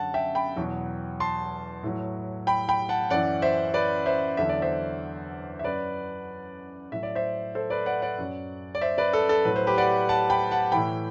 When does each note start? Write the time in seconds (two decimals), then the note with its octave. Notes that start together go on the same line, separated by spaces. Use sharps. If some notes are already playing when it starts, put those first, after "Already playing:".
Already playing: F#2 D3 F#3 F#5 A5
0.14 E5 G5
0.35 G5 B5
0.56 E2 B2 F#3
1.20 A5 C6
1.83 A2 F#3
2.47 G5 B5
2.68 G5 B5
2.89 F#5 A5
3.10 F#2 E3 D5 F#5
3.42 C5 E5
3.74 B4 D5
4.06 C5 E5
4.37 E2 D3 F#3 E5
4.49 D5
4.62 C5 E5
5.59 E5
5.64 F#2 F#3 B4 D5
6.92 A2 F#3 E5
7.03 D5
7.15 C5 E5
7.55 A4 C5
7.70 B4 D5
7.86 D5 F#5
8.02 D5 F#5
8.18 F#2 F#3
8.75 D5
8.81 C5 E5
8.98 B4 D5
9.13 A4
9.29 A4
9.45 A2 F#3 B4
9.56 C5
9.67 G4 B4
9.78 D5 F#5
10.09 F#5 A5
10.30 G5 B5
10.51 F#5 A5
10.72 A2 E3 G5 B5